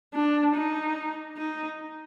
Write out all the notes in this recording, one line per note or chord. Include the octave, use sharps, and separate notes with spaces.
D4
D#4
D#4